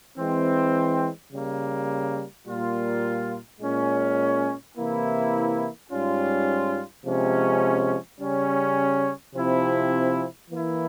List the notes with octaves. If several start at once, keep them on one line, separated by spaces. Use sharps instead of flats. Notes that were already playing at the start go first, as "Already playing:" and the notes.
E3 G#3 C4
C#3 G3 A#3
A#2 G3 A#3 F4
A#2 G#3 C#4
C3 E3 A#3 E4
G#2 G3 C#4 F4
C3 F3 G#3 C#4
C#3 G3 C#4
C3 F3 C4 E4
E3 A#3 E4